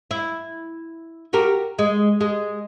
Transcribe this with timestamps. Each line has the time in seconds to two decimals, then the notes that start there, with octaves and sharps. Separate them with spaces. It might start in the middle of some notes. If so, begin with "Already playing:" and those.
0.11 E4
1.33 F#4 G4 A#4
1.79 G#3
2.21 G#3